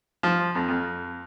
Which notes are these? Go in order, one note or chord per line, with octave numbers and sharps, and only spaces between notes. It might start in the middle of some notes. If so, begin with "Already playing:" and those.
F3
F2
F2